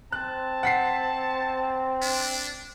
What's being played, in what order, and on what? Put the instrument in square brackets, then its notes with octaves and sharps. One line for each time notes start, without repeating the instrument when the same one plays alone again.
[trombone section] C4 [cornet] A5 [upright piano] F#6
[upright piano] F#5 B6 C7
[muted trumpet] D4